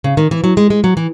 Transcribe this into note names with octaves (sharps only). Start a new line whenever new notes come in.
C#3
D#3
E3
F#3
G#3
G#3
F#3
E3